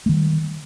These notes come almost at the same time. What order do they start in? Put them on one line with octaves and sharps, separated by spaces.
A3 D#3 G3